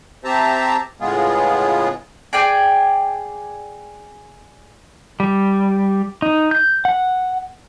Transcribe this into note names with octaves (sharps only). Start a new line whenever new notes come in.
C4 G4 C5 E5 A5 A#5
A2 C#3 G#3 B3 F4 G#4
G#4 D5 G5 G#5
G3
D#4
G6
F#5